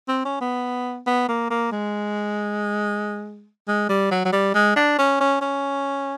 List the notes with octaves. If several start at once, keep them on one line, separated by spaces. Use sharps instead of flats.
C4
C#4
B3
B3
A#3
A#3
G#3
G#3
G3
F#3
F#3
G3
G#3
D4
C#4
C#4
C#4